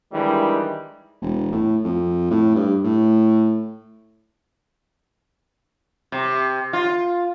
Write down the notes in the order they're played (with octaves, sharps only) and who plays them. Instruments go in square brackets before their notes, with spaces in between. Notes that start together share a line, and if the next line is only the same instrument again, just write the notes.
[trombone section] D#3 E3 G3 G#3 D4
[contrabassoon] E1
A2
F2
A2
G2
A2
[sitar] C3
F4